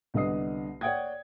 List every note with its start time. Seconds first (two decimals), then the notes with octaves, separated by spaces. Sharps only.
0.14 C2 D3 B3 D#5 D#6 C7
0.81 C#5 D5 F#5 G5 D#6 G#6